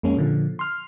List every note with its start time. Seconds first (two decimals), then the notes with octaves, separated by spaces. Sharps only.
0.03 F2 G#3 A#3 C#4
0.17 A#2 D3 F3
0.59 C6 F6